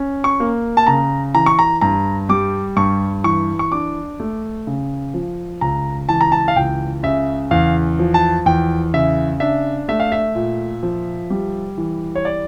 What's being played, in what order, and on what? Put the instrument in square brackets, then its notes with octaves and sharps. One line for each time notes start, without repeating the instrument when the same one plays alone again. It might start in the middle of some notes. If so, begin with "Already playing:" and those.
Already playing: [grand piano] C#4
C#6
A#3
A5
C#3 A#5
E3 A#5
C#6
A#5
G2 A#5
G3 D6
G2 C#6
E3 C#6
C#6
D4 D6
A3
C#3
F3
C#2 A#5
E3 A5
A#5
A5
F5
C#2 G5
C#3 E5
E2 F5
F3
A5
E2 G5
C#3 E5
D4 E5
A3 E5
F5
E5
A#2
F3
G3
E3
C#5
D5